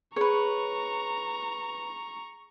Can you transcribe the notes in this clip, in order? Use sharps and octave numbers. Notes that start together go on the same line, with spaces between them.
G#4 B4 C#5 A#5 C#6